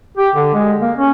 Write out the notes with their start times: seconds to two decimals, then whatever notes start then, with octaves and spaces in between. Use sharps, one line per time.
0.17 G4
0.35 D3
0.53 G#3
0.81 A#3
0.97 C#4